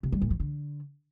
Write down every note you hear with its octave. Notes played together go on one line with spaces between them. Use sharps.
C3
G3
A#2
F3
D3